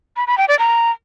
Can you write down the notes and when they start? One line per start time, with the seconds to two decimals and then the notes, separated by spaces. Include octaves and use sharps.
0.17 B5
0.27 B5
0.38 G5
0.48 D5
0.59 A#5